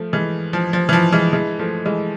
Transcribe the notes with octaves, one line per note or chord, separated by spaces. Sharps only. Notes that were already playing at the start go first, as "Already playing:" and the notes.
Already playing: F3 A3
E3 G#3
F3
F3
E3
F3
E3 G#3
E3 G#3
F3 A3
E3 G#3